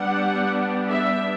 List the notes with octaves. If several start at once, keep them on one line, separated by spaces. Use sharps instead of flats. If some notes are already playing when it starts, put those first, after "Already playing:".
Already playing: G3 B3 D4 F#5
E5